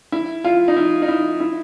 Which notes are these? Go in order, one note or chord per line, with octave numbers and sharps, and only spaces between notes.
E4
F4
D#4
E4
D#4
E4
E4